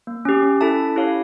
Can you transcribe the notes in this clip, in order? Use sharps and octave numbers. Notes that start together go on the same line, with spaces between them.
A#3
C#4 G4
C#4
E4 A4 E5 A5
C#4
E4 G4 C#5 F5